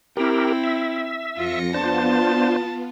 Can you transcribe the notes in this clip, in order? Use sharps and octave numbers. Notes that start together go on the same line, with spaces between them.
C4 E4 G4 A#4
E5
F2 F4 A#6 C#7
B3 D4 F4 C5 A5